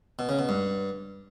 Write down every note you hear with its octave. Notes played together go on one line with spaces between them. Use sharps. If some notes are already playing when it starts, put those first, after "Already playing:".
B2
C#3
B2
G2